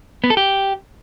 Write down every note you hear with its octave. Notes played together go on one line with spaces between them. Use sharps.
B3
A4
G4